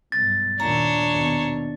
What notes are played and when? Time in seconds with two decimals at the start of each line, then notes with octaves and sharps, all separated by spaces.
0.12 B1 G2 A6
0.60 D#2 A#2 D4 C#5 A#5
1.11 D#2 B2